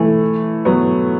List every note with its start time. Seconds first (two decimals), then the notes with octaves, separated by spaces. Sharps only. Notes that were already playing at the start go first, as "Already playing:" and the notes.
Already playing: E3 A3
0.65 F#3 B3